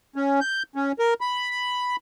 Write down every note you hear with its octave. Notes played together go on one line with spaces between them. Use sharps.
C#4
G6
C#4
A#4
B5